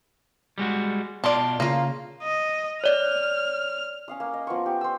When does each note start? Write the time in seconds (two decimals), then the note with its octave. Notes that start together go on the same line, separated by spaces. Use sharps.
0.58 G3 G#3 F#4
1.24 B2 F4 D5 A5 C6
1.60 C#3 A#3 F4
2.23 D#5
2.84 C#5 D5 F6
4.08 C#4 F5 D#6
4.20 A#3
4.34 D#5
4.47 F3 B3 C#6
4.66 G4
4.81 C5 E6